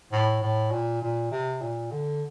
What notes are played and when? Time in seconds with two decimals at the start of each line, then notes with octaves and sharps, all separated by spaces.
0.12 A2
0.42 A2
0.72 A#2
1.02 A#2
1.31 C3
1.61 A#2
1.91 D3